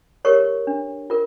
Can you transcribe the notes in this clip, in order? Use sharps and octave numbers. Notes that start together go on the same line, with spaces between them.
G4 A#4 C#5 C#6
D4
F4 A#4